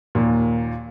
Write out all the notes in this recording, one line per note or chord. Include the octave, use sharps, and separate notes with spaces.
D#2 A#2